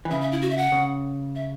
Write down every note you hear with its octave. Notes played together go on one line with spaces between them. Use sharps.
E3
C#3 E5
E5
E4
F#4
E5
F#5
C#3
E5